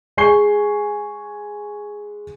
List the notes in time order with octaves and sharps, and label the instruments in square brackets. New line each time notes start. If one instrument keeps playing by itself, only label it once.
[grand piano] G#3 G#5 C#6 C7 G7